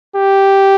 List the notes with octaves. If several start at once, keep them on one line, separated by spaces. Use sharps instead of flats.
G4